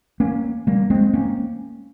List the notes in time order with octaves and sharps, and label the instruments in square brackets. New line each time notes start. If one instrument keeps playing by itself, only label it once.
[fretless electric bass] A#3 C#4
G3 A#3
G#3 C4
A#3 C#4